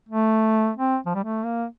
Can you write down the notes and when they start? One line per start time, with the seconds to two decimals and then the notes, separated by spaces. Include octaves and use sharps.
0.09 A3
0.77 C4
1.06 F3
1.15 G3
1.23 A3
1.45 A#3